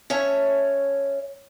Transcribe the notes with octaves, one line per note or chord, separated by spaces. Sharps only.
C#4 C#5 E5 A5